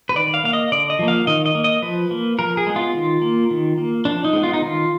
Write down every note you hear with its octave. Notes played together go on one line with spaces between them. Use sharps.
B4
D#3 D5
F5
A#3 F5
D#5
D3 D5
D#5
F3 A#3
F5
D#3 D#5
D#5
A#3
D#5
F3 B4
A#3
F3 A#4
G#4
G#3 B3
F4
D#3
A#3
D#3
A#3
F3 D4
D#4
G#3 B3
F4
D#4
D#3 F4